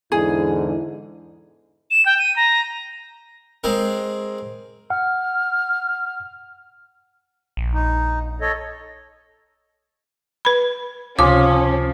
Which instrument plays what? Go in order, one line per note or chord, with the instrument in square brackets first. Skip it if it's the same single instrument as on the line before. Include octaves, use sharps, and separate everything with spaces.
[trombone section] E2 G#2 D3 [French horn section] E4 [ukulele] G#4
[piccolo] E7
G5
D#7
A#5
[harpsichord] G#3 C4 A#4
[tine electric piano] F#5 [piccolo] F6
[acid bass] A#1
[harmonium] D#4
A4 C#5 D#5
[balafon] B4 B5
[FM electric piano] C#2 C3 [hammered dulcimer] F3 [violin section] C#4 [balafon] D6